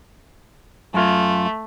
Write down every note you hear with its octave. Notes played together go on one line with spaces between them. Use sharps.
F#2 A3 F4